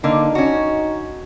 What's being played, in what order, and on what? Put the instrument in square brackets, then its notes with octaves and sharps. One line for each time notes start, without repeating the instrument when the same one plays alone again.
[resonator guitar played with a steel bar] D3 A#3 [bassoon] D#4
[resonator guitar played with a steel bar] C#4 F#4